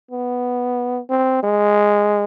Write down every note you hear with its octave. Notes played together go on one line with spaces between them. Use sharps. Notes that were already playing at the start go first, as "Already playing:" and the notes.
B3
C4
G#3